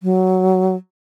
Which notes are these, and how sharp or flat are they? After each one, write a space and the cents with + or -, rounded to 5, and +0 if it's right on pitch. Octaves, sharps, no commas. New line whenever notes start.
F#3 +10